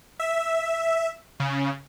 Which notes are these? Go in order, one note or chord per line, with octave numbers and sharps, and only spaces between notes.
E5
C#3